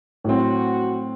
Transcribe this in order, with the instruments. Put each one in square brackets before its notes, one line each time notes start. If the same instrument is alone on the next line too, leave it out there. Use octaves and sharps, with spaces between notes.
[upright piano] A2 F#3 C4 [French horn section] F#4